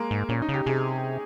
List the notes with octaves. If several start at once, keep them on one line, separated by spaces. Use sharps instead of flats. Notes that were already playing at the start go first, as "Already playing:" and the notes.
Already playing: G#3 A#3
G#2
A#2 C#4
D#4
C#3
G4
C3 G#4